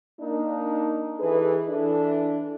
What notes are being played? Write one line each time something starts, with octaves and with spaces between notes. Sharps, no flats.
A#3 D4 D#4
E3 G#4 A4 B4
E3 D4 A4